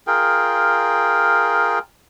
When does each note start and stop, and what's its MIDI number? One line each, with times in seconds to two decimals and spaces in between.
0.07 1.79 65
0.07 1.79 68
0.07 1.79 70
0.07 1.79 79